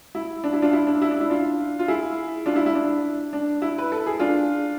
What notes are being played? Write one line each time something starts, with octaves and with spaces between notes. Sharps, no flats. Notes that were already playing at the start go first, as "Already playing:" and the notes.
E4
D4
E4
D4 F4
E4
D4
E4
D4
E4
D4 F4
F4
E4 G#4
D4 F4
E4
E4
D4
D4
E4
B4
A4
G#4
D4 F4